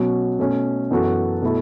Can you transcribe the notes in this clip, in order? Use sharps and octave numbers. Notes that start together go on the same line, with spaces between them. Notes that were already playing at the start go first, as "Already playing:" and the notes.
Already playing: B2 F#3 C#4 F#4
B2 A3 C#4
F#2 E3 B3 F#4 A4
B2 A3 E4 A4